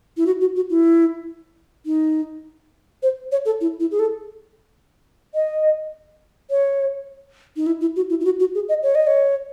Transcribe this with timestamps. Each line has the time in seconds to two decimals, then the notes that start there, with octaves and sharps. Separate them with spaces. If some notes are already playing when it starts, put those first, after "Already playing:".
0.17 E4
0.26 F#4
0.41 F#4
0.56 F#4
0.70 E4
1.86 D#4
3.03 C5
3.32 C#5
3.45 A4
3.61 E4
3.80 E4
3.91 G#4
3.99 A4
5.35 D#5
6.51 C#5
7.57 D#4
7.66 E4
7.81 E4
7.96 F#4
8.10 E4
8.20 E4
8.25 F#4
8.40 F#4
8.55 G#4
8.69 D#5
8.83 C#5
8.95 D#5
9.07 C#5